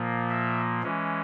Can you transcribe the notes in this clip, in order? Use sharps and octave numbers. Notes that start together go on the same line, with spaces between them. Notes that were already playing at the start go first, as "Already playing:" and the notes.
Already playing: A#2 F3 A#3
E5
E3 G#3 C#4